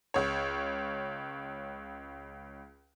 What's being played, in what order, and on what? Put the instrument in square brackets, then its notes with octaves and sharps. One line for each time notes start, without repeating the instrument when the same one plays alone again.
[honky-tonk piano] C#2 C#5